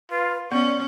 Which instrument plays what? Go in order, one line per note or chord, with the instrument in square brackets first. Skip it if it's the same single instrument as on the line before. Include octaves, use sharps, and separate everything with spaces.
[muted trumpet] F4 [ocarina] B4
[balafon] B3 [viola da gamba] C#4 [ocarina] D5 [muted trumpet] C#6